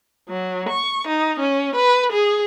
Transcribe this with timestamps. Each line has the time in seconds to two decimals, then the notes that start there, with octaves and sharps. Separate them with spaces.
0.29 F#3
0.69 C#6
1.07 D#4
1.40 C#4
1.76 B4
2.12 G#4